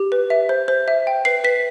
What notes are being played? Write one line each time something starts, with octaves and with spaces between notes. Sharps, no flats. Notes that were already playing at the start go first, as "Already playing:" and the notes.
Already playing: G4
B4
E5
C5
C5
E5
G5
B4 C7
B4 B6